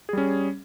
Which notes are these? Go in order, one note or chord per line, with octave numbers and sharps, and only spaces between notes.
G3 C#4 G#4